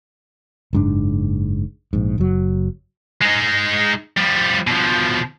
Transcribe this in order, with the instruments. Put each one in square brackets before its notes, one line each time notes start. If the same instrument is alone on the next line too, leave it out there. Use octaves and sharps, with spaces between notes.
[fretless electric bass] F#1 G#2 D4
A#1 G#2
F#1 F#3
[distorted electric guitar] G#3 D#4
F3 G3
B2 F3